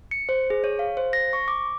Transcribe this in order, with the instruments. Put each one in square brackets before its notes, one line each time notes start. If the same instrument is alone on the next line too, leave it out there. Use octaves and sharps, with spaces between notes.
[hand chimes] C#7
C5
G#4
C#5
F5
C5
A#6
C#6
D6